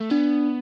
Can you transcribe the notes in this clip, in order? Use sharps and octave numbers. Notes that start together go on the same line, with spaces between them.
A3
B3 D4